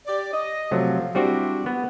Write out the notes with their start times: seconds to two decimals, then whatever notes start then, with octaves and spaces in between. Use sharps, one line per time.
0.07 G4 D5
0.32 D#5
0.71 C3 F3 F#3 A3
1.15 G3 C4 D4 E4 F#4 G4
1.66 B3